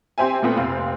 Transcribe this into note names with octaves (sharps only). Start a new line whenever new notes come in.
C4 G4 C5 E5 G#5
A#2 A3 B3 C4
F1 C4 F5